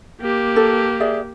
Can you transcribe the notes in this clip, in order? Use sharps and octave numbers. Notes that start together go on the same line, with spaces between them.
A#3 G4
A4
G#4 D5 E5